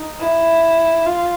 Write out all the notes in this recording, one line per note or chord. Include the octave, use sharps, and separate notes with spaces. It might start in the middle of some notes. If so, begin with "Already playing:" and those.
Already playing: D#4
E4
F4